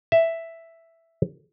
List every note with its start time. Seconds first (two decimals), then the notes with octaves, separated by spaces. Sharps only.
0.12 E5